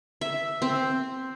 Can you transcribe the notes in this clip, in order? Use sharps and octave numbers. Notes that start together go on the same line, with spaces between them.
E5
C4